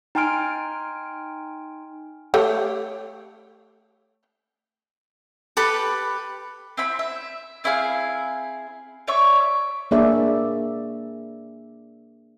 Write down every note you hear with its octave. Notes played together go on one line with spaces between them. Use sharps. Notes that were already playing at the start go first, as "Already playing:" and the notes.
D#4 G5 G#5 C6 F6 D7
A3 G4 C#5
G4 A4 B4 B5
C4 E4 B5
E5
C4 E4 G#4 F5
C#5 D5 E5 C#6
A#3 D4 G#4 A#4 D5 E5